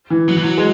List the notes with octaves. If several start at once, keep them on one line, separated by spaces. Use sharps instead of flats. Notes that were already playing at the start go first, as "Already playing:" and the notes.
E3
F#3
E3
F#3
G#3